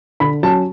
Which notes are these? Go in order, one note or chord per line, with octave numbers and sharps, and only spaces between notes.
D3 B5
F#3 C#4 A5